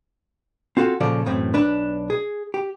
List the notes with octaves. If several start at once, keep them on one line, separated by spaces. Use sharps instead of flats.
C4 F4 F#4 A4
A#2 C#3 F3 A4 D5
F#2 A2 E3 C4
B1 D4 B4
G#4
G4